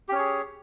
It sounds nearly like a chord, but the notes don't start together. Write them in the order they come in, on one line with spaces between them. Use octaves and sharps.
G4 C#4 C#5 G#4